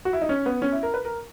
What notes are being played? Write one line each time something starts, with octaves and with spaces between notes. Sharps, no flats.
F#4
E4
D#4
C#4
B3
C#4
E4
A#4
B4
A#4